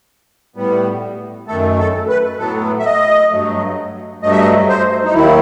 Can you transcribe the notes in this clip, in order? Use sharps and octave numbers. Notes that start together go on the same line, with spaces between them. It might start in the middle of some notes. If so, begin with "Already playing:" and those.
A2 G3 B3
F#2 D#3 A3 A4
A4
B4
A2 F#3 B3 A4
E5
D#5
G2 F#3 A3
G2 F#3 A3 D#5
E5
D#5
C5
D#4
D#2 D#3 F#3 E4